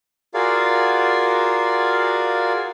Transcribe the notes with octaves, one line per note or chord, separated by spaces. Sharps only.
F4 F#4 G#4 A#4 D5 F5